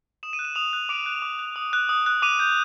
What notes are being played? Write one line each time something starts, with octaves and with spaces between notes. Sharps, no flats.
D#6 E7
D#7
F#6
E7
D#6 F7
F#6
D6 D7
F#6
D6
F#6
D#6
F#6
D#6
F#6
D6 D#7
G6